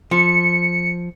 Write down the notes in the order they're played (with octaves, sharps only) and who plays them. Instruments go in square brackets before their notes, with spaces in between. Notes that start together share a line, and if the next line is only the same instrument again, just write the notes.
[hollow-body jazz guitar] F3 [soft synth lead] C#7